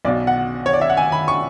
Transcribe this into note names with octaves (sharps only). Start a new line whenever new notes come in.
B1 B2 D5
F#5
C#5
D5
E5
F#5
G#5
B5
C#6